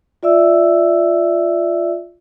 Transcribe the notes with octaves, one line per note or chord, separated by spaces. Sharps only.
F4 D5 E5 E6